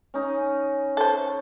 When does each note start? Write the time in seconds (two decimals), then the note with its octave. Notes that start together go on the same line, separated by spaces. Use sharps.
0.14 C#4 D#4
0.97 A4 C5